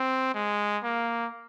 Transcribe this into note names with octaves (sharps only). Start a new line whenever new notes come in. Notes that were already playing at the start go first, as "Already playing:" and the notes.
Already playing: C4
G#3
A#3